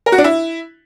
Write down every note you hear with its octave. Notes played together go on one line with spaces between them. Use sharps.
A#4
F#4
D4
E4